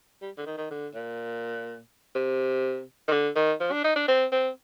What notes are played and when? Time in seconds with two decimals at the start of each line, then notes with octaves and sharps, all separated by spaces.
0.22 G3
0.38 D3
0.46 D#3
0.58 D#3
0.71 D3
0.94 A#2
2.15 C3
3.08 D#3
3.12 D3
3.36 D#3
3.60 F3
3.72 D4
3.84 D#4
3.96 D4
4.08 C4
4.32 C4